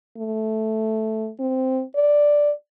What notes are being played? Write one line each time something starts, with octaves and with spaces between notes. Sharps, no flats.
A3
C4
D5